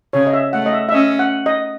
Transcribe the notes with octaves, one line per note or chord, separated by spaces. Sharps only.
C#3 C#5
D#5
E5
A3 F#5
D#5
E5
E5
C#4 D#5
F#5
D#5